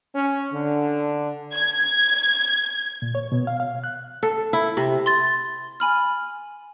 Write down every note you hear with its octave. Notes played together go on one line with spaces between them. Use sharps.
C#4
D3
G#6
A#2
C#5
B2
F5
F5
F#6
A4
E4
C3
C6 A6
G#5 B5 F6